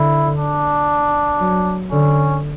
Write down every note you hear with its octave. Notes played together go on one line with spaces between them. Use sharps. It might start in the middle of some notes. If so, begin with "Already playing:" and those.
Already playing: D3 E4
D4
F#3
D3 C#4